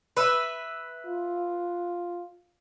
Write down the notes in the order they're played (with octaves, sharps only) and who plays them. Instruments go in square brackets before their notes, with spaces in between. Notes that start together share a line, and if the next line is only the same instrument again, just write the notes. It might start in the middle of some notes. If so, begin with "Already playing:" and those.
[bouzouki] B4 E5
[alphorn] F4